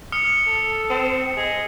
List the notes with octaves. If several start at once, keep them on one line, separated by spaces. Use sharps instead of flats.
D#6 F6 C#7
A4
C4
G#4 D#5